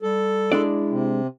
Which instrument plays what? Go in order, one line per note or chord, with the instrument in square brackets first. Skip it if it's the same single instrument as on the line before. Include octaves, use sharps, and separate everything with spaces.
[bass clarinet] G3 [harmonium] A4
[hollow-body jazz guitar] G#3 D4 D5 [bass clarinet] E4
[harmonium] C3